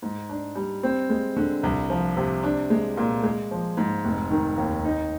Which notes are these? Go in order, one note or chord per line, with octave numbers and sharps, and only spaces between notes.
G#2
D4
G3
C4
G#3
D3
C2
F3
C3
D4
G#3
A#2
G#3
F3
G#2
F1
D#3
D#2
D#4